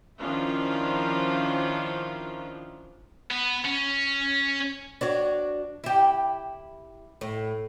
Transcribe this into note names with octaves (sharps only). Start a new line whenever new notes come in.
D#3 F3 C#4 D4 E4 F4
B3
C#4
D4 F#4 C#5
E4 G4
A2